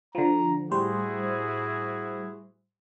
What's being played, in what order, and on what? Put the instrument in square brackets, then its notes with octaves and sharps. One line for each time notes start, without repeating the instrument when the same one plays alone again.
[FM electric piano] D3 F3 [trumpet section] A#5
[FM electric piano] A2 G3 C5 [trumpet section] E4 F#4 G#4